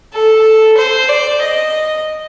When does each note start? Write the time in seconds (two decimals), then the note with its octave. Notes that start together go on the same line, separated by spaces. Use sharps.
0.13 A4
0.77 C5
1.08 D5
1.41 D#5